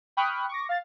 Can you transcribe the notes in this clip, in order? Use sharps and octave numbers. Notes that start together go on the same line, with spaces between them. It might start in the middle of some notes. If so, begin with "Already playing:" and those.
G5 B5 C#6 D#6 F6 F#6
C#6 D6 A#6
F5 A6